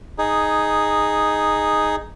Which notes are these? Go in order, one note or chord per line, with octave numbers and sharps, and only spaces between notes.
D#4 G#4